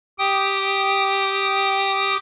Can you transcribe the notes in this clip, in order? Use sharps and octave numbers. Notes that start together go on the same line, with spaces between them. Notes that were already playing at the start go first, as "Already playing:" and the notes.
G4 G5 D#6